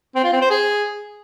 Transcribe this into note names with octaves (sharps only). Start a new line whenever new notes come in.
C4
F4
C4
C5
G#4